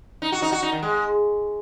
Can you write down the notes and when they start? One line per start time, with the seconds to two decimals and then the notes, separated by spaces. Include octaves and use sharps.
0.22 D#4
0.32 F#4
0.42 D#4
0.52 F#4
0.62 D#4
0.72 D#3
0.83 G#3